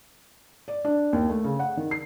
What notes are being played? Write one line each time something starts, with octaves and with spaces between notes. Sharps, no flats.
D5
D4
D#2
A3
C#3
F#5
D#3
C7